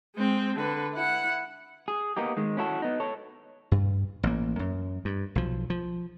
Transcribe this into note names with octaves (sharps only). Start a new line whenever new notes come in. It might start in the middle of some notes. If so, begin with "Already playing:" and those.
G#3 C4
D3 B4
E4 F#5
G#4
A#3 B3 D#4 G4
D#3 G#3
C#4 E4 F#4 A4
B3 D#4
A4 C#5
G2
A1 A#3
F#2
G2
B1 F3
F3